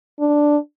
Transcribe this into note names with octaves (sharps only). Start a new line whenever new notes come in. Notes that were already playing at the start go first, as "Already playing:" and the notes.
D4